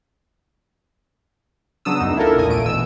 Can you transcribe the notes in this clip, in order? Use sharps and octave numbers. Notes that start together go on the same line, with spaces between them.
C#3 F#3 B3 D4 D#6 E6
C#2 F#2 D#4 E7
D4 E4 F4 A4 A#4
A#1 E2 A#2 D#5 G#5
A#2 A3 D7 D#7
G#1 B2 E3 E6